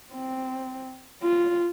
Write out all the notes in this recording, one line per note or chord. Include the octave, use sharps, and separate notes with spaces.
C4
F4